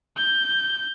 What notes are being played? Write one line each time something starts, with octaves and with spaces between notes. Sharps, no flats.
G6